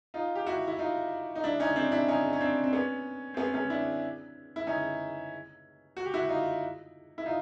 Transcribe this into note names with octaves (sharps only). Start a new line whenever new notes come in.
D#4 F4
G4
E4 F#4
E4
D#4 F4
D#4
D4 E4
C#4 D#4
C4 D4
D4 E4
C#4 D#4
C#4
C4 D4
C4
B3 C#4
C4
B3 C#4
B3 C#4
D4 E4
E4
C#4 D#4
F#4
G4
E4 F#4
D#4 F4
E4
D#4 F4